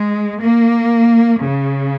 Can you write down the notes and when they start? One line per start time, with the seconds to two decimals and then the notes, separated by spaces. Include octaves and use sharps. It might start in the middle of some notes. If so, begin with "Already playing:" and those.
Already playing: G#3
0.40 A#3
1.43 C#3